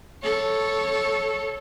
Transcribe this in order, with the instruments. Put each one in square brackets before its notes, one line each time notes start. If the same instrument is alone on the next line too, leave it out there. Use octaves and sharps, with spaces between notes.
[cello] A4 C#5